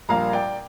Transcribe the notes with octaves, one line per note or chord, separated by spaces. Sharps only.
A#1 A#2 G3 A#3 F5 A#5
D5 G5